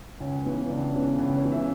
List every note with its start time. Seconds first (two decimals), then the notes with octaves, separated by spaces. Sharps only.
0.20 C#2 C#4
0.45 C#3 E3 B3
0.70 C#2 D4
0.94 C#3 E3 B3
1.18 C#2 B4
1.35 C#5
1.43 C#3 E3 B3
1.52 E5